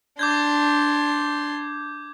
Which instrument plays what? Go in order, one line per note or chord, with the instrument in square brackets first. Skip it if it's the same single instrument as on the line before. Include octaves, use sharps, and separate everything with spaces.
[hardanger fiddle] D4 C6 [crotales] D6 G6 G#6